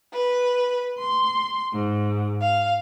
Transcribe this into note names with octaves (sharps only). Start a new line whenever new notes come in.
B4
C6
G#2
F5